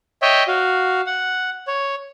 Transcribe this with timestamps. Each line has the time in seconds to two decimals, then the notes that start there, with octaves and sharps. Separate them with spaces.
0.22 C#5 D#5 E5 G5
0.48 F#4 F5
1.06 F#5
1.67 C#5